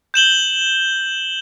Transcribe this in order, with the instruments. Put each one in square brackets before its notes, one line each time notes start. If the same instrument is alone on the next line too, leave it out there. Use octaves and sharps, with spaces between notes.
[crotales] G6 E7 F#7 G7